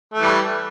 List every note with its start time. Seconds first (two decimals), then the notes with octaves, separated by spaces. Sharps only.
0.14 A3
0.18 E3
0.23 G3